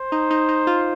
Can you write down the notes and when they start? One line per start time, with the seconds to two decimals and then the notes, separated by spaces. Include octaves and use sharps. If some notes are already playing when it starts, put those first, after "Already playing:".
Already playing: C5
0.12 D#4
0.31 D#4
0.49 D#4
0.67 F4